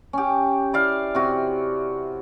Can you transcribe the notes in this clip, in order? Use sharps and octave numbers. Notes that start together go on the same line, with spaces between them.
C#4 G4
E4 D5 F5
C3 F#4